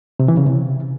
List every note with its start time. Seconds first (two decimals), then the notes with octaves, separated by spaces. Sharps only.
0.20 C3
0.28 E3
0.37 C#3
0.46 C3